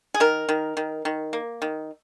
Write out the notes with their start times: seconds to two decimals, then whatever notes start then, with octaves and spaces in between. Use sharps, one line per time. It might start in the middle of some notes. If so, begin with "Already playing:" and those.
0.14 G#4
0.20 D#3 A#4
0.49 D#3
0.77 D#3
1.05 D#3
1.33 A#3
1.62 D#3